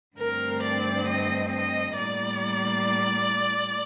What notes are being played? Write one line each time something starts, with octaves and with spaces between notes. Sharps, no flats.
G2 D3 A3 C4 A#4
D5
D#5
D#5
A2 G3 A#3 D5